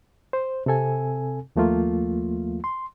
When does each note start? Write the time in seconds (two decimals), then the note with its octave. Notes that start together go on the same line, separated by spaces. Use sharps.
0.33 C5
0.66 C3 C4 A4 G#5
1.56 D#2 F3 A3 A#3 F4
2.64 C6